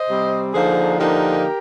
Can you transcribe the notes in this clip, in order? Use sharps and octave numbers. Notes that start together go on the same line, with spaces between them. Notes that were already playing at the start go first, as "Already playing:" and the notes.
Already playing: C5 D#5
C3 G3 C4
D3 F3 A#3 D#4 G#4 C5
D3 F3 A#3 D#4 G4 A#4